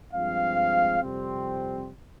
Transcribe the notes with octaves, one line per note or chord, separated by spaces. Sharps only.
G2 F3 G#3 C4 F5
F2 C3 G3 C4